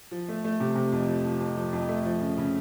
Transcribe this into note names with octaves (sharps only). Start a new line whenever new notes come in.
F3
A3
A3
C3
C3
F2
F3
F3
F2
F3
F2
A3
F3
C#3
C#3